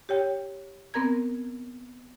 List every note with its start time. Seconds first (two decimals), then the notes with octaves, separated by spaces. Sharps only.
0.09 G4 C#5 G5
0.94 B3 C4 A#4 A#5 G#6